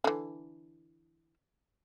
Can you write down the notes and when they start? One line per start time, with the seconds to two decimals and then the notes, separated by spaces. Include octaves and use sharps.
0.04 D3 E3